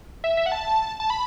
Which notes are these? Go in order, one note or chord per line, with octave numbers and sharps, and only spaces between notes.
E5
E5
F#5
A5
A5
B5